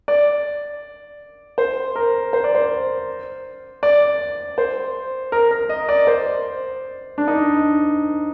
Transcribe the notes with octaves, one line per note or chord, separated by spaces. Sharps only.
D5
C5
A#4
C5
D5
C5
D5
C5
A#4
A#4
D#5
D5
C5
D4
D#4